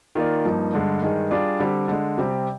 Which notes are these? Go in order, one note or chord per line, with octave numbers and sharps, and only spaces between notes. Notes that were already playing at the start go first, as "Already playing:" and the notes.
D#3 A#3 F4 A#4 D5
G2 F3 A#3 D#4
G2 D3 G#3
G2 D#3 G#3 D#4 G#4
G3 D4 F4 G#4 D5
D3 G3 C4 G4
D3 G#3 D4
C3 G3 C4 G4